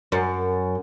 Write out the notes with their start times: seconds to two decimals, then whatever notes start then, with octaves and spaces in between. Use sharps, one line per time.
0.12 F#2